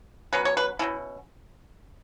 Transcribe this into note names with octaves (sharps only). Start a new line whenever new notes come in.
B2 F#3 C#4 B4
C#5
B4
B2 F#3 C#4 E4